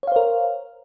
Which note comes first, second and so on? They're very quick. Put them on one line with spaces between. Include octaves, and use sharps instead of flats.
C#5 F5 C5 A#4